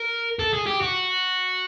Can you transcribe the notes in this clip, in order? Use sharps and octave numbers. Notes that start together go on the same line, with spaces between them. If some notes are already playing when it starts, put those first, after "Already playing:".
Already playing: A#4
A4
G#4
G4
F#4